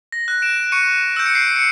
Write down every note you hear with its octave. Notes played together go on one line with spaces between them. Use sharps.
A#6
F#6
D7 E7
C#6 C#7 D#7
E6 G6 D7
C#7
C7 D7
C#7